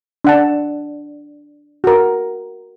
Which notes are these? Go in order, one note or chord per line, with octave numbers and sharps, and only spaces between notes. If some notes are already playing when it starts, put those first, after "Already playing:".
D4 F#5 A5
F#4 A#4